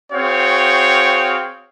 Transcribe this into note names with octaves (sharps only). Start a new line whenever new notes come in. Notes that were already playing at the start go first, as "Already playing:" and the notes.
C4 F#4 G#4 C#5 F5 G5